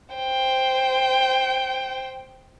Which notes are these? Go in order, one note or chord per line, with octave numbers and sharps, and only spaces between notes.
C5 G5